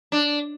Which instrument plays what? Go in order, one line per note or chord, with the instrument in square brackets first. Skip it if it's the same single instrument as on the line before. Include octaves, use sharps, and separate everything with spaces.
[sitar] D4